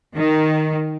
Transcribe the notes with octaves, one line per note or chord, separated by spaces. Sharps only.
D#3